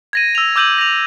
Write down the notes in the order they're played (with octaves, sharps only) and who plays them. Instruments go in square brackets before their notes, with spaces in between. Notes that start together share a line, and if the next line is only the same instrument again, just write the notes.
[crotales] G#6 A#6 D#7
E6 F7
D6 E6 G6 D#7 F#7
A#6 F7